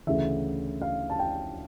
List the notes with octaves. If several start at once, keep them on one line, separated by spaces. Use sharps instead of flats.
D2 C#3 E3 E5
F5
A5
G5